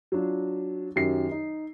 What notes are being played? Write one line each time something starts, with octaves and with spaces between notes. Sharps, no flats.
F#3 D4 F4
F#2 D#3 F#3 G4 C7
D#4